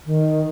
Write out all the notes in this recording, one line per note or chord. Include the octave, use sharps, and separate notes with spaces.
D#3